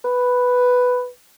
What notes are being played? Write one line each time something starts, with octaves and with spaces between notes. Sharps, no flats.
B4